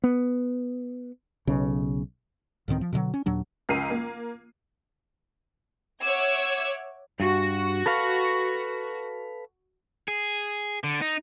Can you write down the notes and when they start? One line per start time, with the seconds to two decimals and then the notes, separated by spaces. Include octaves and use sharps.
0.04 B3
1.47 B1 C#3
2.68 C#2 A2 D#3 C4
2.81 F3
2.92 B2 D3 D#3 F#3
3.14 C#4
3.26 D#2 A#2 F#3 D4
3.69 C#2 A#4 C7 D#7
3.90 A#3
6.01 C#5 E5 F#5 D6 E6 G#6
7.20 G2 F#4
7.86 A4 B4 F5
10.08 G#4
10.84 D3
11.01 D#4